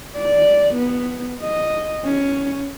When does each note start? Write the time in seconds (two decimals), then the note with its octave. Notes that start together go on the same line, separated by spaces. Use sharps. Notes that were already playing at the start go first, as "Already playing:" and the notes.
0.17 D5
0.75 B3
1.42 D#5
2.05 C#4